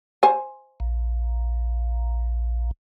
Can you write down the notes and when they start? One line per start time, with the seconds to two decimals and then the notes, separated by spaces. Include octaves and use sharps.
0.23 C5 G#5
0.80 A#1